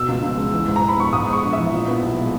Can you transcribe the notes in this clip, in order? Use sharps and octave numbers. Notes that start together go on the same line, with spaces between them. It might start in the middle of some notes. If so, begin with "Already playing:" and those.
Already playing: B2 E6
C#2
C#2
G#3
E3
G#2
A#5
G#2
B5
B3 C#6
G#2 D#6
G#3
C#6
A#1
E3 E5
A#2
B3
B1
G#3